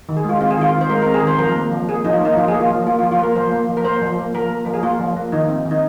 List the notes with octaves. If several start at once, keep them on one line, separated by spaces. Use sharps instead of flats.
D#3
G#4
G#3 F4
C4 F4
G#4
D#3 F4
D#3
C5
G#3 A#4
C4 A#4
G#4
D#3 C5
F3 A#4
A#3
F3
A#3 G#4
F3 D#4
F4
A#3 D#4
F3 F4
G#4
A#3
F4
F3
A#3 F4
F4
F3
F4
A#3 A#4
F3 C5
A#3
F3
A#4
A#3 C5
F3
A#3
F3 A#4
A#3
F3 A#4
G#4
A#3 F4
F3
A#3
D#3 D#4
C4
D#3
D#4